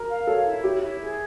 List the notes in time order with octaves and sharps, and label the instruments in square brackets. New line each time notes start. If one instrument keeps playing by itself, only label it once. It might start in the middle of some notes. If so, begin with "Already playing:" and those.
Already playing: [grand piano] A#4
[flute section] F5
[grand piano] A4 [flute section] C#5
[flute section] E4
[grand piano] G4 [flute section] C#5
[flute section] E4
G#4